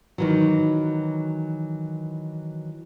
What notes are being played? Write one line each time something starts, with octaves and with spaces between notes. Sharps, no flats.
D#3 E3 F#3